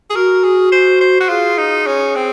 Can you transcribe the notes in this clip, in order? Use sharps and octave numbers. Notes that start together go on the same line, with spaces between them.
G#4
F#4 A#4
G#4
C5
C5
F#4
F4 G#4
D#4
C#4
C4